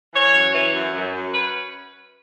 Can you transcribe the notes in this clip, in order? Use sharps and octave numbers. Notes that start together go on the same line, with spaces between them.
E3 C#5
F#2
E3
F#2
F#2
F#2
C#4 B4